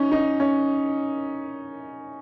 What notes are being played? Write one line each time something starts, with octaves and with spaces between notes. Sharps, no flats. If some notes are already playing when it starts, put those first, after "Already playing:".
Already playing: C#4 D#4
D#4
C#4